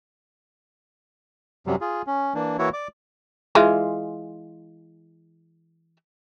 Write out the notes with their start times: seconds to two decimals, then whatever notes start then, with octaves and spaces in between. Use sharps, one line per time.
1.67 F#2 C3 F#3 G3
1.81 F4 G#4
2.07 C#4
2.35 E3 A#3 D4
2.59 E3 A#3 E4 F#4 C#5
2.73 D5 D6
3.55 E3 G#3 F4